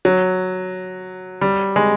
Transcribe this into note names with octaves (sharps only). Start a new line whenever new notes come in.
F#3
G3
G#3